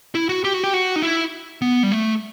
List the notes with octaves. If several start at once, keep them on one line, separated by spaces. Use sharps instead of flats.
E4
F#4
G4
F#4
G4
F#4
D#4
E4
B3
G3
A3